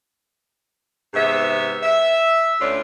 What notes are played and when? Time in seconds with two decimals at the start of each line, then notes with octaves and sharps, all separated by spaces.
1.14 G#2 C3 B3 E5
1.82 E5
2.59 D2 C#4 F4 B4 D5